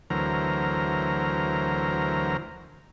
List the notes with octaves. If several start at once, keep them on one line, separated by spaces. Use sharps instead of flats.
D2 E3 F#3 A#4 C5 A#5